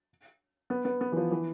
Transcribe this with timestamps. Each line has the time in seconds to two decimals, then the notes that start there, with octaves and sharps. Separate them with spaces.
0.70 B3
0.85 B3
1.01 B3
1.12 E3
1.16 F3
1.31 E3